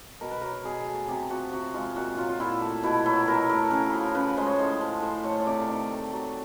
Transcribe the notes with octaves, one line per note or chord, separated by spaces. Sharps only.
B2 A#4
B4
F#3 A#4
B2 G#4
A3
C3 G4
F3 F#4
C3 F#4
G#3 F4
A#2 F#4
F#3 F4
F4
A#2 E4
A3
B2 E4
F#3 E4
B2 A#4
A3 A#4
C#3 A#4
F3
C#3 B4
G#3 C5
C#5
A2 C5
F3
A2 C5
A3 C#5
C#5
C3 D5
D#3
A3
F#3